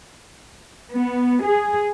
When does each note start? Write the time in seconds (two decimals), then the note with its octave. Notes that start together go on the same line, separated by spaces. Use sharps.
0.91 B3
1.43 G#4